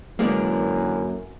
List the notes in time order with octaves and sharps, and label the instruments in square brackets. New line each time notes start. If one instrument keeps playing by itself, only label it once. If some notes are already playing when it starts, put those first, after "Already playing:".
[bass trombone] F#2 [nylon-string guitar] D3 E3 G#3 [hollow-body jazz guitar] A#3 A4 D5